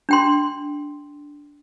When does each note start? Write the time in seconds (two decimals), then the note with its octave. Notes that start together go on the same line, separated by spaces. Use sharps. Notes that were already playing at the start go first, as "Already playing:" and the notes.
0.09 D4 G5 C6